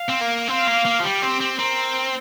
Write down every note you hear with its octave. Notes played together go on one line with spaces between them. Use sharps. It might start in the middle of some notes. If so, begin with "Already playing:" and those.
Already playing: F5
C4
A#3
C4 F5
A#3
A#3
F3
G3 G4
C4
C4
C4 A#4